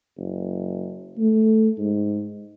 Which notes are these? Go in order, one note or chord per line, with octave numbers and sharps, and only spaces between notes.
F#1
A3
G#2